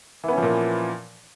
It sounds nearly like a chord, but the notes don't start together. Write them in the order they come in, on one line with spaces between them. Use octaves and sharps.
E3 B3 C#4 F3 A#2